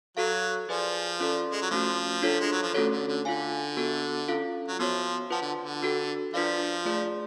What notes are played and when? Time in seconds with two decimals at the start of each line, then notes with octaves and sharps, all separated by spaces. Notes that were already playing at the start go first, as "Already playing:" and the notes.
0.17 F#3 F#4 A4 F5
0.68 F3 G#4 B4 D5 G#5
1.20 C#4 F4 A4 D5
1.52 G#3
1.61 F#3
1.71 F3 A3 C#4 F#4
2.22 D4 F4 A4 C#5
2.40 G#3
2.52 F#3
2.63 F3
2.74 D3 A3 C#4 F#4 A4 C#5
2.92 D3
3.08 D3
3.25 D3 F4 A4 F5 G#5
3.77 B3 F#4 A4
4.28 C#4 F4 A4 F5
4.68 F#3
4.79 F3 B3 F#4 C#5
5.30 F3 F4 B4 F#5 A5
5.41 D3
5.61 D3
5.82 D4 F#4 A4
6.34 F3 D4 F4 B4 D5 F5
6.85 A3 F4 G#4 D5